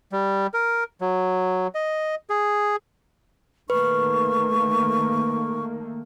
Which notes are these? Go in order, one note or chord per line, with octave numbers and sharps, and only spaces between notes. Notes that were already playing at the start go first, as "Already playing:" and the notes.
G3
A#4
F#3
D#5
G#4
D#3 A3 A#3 B4 C#6